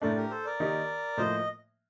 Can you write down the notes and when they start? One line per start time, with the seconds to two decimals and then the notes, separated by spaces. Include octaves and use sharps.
0.02 A2 A3 D4 A#4 D5
0.16 G4 A#4
0.30 A4 C5
0.45 A#4 D5
0.60 D#3 A#3 D#4 G4
1.17 A2 F3 A#3 C5 D#5